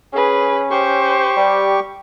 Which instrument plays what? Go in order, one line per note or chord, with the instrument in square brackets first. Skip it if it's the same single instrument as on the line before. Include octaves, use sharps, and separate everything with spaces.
[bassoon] C#4 [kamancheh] G#4 B4
[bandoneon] G4 C#6 [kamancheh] C5
[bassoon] G3